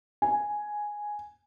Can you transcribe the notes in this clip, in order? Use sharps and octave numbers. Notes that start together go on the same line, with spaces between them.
G#5